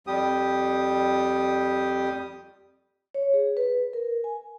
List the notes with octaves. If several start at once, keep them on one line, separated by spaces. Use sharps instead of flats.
F2 G3 G4 D#6
C#5
G#4
B4
A#4
G#5